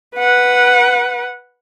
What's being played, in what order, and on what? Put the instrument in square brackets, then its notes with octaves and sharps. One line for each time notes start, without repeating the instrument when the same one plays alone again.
[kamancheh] B4 F#5